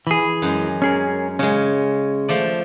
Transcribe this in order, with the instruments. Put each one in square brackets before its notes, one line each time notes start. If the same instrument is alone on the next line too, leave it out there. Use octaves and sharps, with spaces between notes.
[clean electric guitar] E3 G#4 [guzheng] B5
[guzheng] F#2 G#3
[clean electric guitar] C#4 G#4 A#4
[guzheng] C#3 G#3 [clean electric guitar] C#4
[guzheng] F3 A3 D5